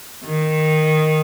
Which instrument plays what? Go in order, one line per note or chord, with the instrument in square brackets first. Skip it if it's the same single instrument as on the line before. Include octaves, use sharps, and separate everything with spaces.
[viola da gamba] D#3